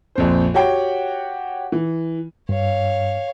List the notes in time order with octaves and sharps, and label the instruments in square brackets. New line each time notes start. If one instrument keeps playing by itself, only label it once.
[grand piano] A#1 F2 C5
F#4 G4 C#5 F#5 G5
E3
[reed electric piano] G2 [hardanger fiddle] C#5 F5